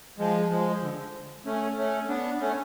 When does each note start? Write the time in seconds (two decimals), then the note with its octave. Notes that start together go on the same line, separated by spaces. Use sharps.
0.19 F3 G#3
0.50 F3 G#3
0.82 D3
1.46 A3 C#4
1.77 A3 C#4
2.09 B3 D4
2.41 A3 C#4